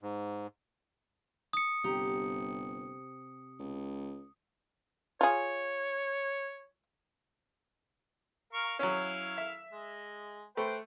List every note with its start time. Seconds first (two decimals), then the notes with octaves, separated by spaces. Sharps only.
0.02 G#2
1.53 D#6 C#7
1.84 G1 C3 G4 A#5
3.59 C#2
5.21 F4 G#4 C#5
8.53 A#4 F5 C#6
8.79 F#3 C#4 E4 F5
9.38 E5
9.73 G#3
10.57 A3 B4 C5 G5